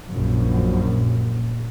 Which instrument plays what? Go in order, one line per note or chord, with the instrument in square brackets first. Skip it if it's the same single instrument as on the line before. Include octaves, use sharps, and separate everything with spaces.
[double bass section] A#1 F#2